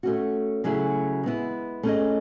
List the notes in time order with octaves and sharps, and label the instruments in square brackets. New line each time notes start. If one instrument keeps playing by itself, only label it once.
[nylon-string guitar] A3 C#4 F#4
C#3 F#3 A3 E4 G#4
G#3 B3 E4
A3 C#4 G#4 D#5